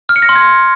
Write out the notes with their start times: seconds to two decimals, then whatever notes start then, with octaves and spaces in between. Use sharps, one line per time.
0.09 F6
0.16 C#7
0.22 A#6
0.29 C6
0.35 G#6